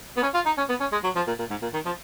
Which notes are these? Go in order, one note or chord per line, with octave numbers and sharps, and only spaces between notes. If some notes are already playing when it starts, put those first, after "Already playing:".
B3
C#4
F4
D#4
C#4
B3
C#4
G#3
F#3
F3
A#2
A#2
G#2
A#2
D#3
F3